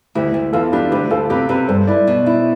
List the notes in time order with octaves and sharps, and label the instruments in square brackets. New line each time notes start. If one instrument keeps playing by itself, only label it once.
[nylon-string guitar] D2 [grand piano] E4 G4
[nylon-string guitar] D2
[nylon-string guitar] E2 [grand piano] F4 A4
[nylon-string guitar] D4 [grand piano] G4 B4
[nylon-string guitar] D2 [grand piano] G4 B4
[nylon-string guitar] D2 [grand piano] F4 A4
[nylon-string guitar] C3 [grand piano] G4 B4
[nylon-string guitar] C3 [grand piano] G4 B4
[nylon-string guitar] G2 [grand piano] A4 C5
[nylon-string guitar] E4 [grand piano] B4 D5
[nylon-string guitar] B2
E4